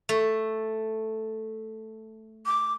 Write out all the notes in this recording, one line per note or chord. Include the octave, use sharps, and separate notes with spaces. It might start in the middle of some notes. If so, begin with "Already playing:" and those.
A3
D6